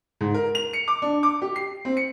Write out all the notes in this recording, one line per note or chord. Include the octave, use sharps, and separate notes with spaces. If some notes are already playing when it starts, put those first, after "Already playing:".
G#2
A#4
F7
C#7
D6
D4
D6
G4
C7
C4
C#7